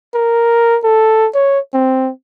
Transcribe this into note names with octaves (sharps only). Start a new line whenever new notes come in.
A#4
A4
C#5
C4